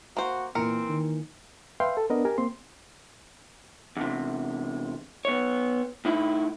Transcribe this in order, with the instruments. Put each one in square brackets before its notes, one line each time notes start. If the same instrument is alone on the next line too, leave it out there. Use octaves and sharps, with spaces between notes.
[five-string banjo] A#3 C5 [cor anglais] F#4
[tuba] A#2 [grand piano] E3 A#3 C#7 [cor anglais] C4 [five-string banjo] A#4
[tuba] D#3
[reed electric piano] B4 E5 F5 G5 C6
A4
B3 D4 A#4 D#5
G4 A#4 G#5
A#3 C4 C6
[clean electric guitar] E2 C3
B3 C#5
A2 D#4 E4